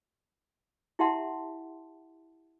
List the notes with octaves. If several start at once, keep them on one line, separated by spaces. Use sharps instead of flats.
E4 G4 E5 F#5 A5 C6